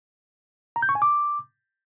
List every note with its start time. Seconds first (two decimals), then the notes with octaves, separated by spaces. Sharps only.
0.76 A#5
0.82 G6
0.89 C#6
0.95 G#5
1.02 D6